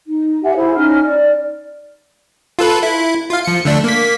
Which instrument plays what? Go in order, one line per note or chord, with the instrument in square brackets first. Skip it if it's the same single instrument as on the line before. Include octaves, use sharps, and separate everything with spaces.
[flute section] D#4
G4 E5 F#5 G#5
E4 G#4 C5
C#4 D#4 F6
D5
[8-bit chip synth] F4 A4 B4
E4
F4 F5
F3 C#7
D3 A3 D4
A#3 B6